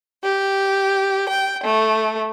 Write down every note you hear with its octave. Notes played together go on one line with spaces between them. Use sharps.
G4
G5
A3